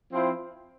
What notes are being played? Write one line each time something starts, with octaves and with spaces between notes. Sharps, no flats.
F3 C4 E4